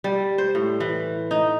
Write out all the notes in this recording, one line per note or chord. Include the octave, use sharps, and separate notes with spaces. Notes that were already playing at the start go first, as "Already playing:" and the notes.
G3
C5
A2
E3
D#4